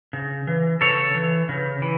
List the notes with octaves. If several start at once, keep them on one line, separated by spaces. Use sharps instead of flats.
C#3
E3
C#3 A4 C#5
E3
C#3
E3